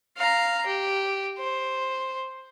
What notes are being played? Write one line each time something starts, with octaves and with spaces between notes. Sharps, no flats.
F5 A#5
G4
C5